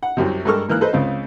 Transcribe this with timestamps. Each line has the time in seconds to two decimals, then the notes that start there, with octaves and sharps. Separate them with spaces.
0.03 F#5
0.17 C2 F#2 C3
0.45 G2 G#3 A4 A#4 C#6 F6
0.69 G#2 E3 A#3 F6 F#6
0.81 A4 B4 C5 D#5
0.93 C#2 C#3 C4 F5